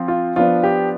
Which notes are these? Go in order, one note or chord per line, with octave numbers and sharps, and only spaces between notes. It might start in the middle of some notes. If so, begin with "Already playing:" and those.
Already playing: F3 C4
F4
F3 B3 D4 F4
G4